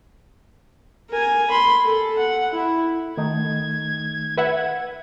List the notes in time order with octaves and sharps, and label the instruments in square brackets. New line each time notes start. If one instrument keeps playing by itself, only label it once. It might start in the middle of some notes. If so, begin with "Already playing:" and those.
[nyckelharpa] A#4 G#5
B5 C6
A4
F#5
E4
[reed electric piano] D#3 A3 D#4 [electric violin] G#6
[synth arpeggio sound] B4 E5 F#5